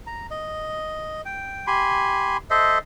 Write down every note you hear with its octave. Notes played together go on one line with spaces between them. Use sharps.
A#5
D#5
G5
G4 G#5 B5 C6
A4 C5 D#5 E5